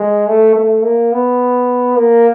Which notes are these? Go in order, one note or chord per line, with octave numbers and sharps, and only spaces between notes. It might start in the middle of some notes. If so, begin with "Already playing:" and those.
Already playing: G#3
A3
A3
A#3
B3
A#3